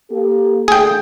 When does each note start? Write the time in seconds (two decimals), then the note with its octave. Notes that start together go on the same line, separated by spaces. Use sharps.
0.11 A#3 G4 A4
0.68 D3 A3 G#4 G5